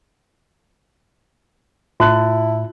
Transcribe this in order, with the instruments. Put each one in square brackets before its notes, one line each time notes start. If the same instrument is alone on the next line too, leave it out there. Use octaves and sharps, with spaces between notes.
[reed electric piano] A2 [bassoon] E4 [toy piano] F4 [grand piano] A5 F#6